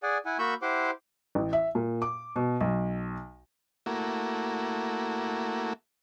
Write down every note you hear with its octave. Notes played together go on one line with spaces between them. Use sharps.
G#4 D5 F#5 G#5
E4 F#5 G#5
A#3 F#4 B5 C#6 E6 G6
E4 G4 C5 F#5 C6 D6
A1
E5
A#2
D6
B2
B1
A3 A#3 E4 F#4